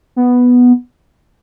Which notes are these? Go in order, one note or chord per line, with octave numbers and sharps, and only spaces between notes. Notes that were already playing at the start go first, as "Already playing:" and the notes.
B3